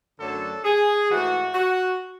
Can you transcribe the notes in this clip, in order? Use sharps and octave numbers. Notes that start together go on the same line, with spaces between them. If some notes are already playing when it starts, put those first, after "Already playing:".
F#2 D3 F#3 A3 D4 A4
G#4
G#2 E3 A3 F#4
F#4